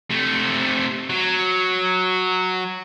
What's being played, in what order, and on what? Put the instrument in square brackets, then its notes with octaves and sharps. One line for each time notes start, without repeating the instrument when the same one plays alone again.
[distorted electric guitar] C3 A3
F#3